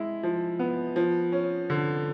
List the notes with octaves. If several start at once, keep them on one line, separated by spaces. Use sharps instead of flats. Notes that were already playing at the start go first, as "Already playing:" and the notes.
Already playing: G#3 E4
F3
B3
F3
C#4
D3